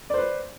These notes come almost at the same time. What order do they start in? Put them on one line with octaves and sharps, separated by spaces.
D5 C5 B4